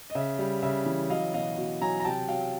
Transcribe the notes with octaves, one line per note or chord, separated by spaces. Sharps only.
D#5
C#3 E5
G3
C#3 E5
E3
F#3 D#5 F5
B2 D#5 F5
B2
F#3 G#5 A#5
A#5
C3 G5 A5
F#3 F5 G5